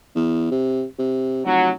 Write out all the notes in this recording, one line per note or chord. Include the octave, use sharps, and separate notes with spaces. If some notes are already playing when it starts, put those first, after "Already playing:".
E2
C3
C3
F1 F#3